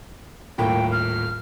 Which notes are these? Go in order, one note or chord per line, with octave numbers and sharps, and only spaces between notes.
D#1 A2 A#3 G5
F6